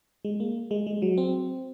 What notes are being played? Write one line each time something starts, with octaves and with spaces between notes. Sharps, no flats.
G#3
A#3
G#3
G#3
F#3
C4